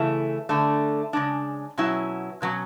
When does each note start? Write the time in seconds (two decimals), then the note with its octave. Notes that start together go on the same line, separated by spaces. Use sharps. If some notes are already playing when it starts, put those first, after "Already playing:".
Already playing: C#3 E3 A3 E4
0.49 D3 A3 D4
1.13 C#3 G#3 D4
1.78 B2 F#3 C#4 E4
2.42 B2 F#3 C#4